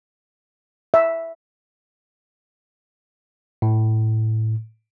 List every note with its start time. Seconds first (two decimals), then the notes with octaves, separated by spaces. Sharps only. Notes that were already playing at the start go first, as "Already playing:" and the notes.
0.94 E5
3.62 A2